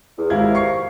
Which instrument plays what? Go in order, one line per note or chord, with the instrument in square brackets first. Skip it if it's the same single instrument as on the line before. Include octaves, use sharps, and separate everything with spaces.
[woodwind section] E2
[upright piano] G#1 E4 G#6 [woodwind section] C3 A#4 F5
[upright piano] C#6 C7